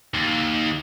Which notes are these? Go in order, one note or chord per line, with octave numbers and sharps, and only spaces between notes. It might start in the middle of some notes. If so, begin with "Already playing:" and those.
D#2